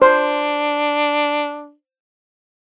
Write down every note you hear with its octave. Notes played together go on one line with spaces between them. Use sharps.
D4 C5